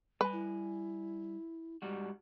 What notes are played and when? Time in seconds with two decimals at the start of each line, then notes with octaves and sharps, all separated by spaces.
0.21 G3 B4 G#5
0.33 E4
1.82 G#2 G3 F#4